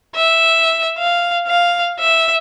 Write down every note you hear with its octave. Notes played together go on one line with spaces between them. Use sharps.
E5
F5
F5
E5